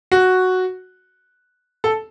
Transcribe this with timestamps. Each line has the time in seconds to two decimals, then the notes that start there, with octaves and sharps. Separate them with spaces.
0.12 F#4
1.84 A4